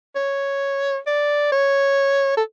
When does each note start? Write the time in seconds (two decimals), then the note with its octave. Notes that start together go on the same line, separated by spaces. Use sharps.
0.16 C#5
1.07 D5
1.52 C#5
2.37 A4